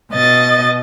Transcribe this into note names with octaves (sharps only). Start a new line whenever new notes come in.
B2 D#5 A6